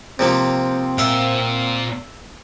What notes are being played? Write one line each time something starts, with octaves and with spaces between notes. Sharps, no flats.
C3 F3 A#3 C4
A#2 A#4 E5 F5